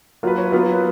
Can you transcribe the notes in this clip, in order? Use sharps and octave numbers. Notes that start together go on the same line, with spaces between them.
F#3 A#3 F4 B4
C#5
F#3 B3 F4 B4